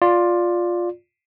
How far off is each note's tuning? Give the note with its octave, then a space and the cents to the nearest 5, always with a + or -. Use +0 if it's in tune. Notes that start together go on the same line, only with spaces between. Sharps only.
F4 +10 D5 +0